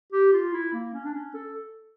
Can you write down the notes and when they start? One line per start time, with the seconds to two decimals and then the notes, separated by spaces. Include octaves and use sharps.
0.12 G4
0.33 F4
0.53 E4
0.73 A#3
0.93 C#4
1.05 D4
1.13 C#4
1.34 A4